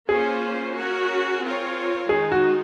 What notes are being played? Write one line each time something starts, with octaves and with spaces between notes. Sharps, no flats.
A#3 C#4 F4 G#4 C5
C#4 F#4 A#4
C4 F4 A#4 C#5
D#3 G#3 D#4 G#4
F#4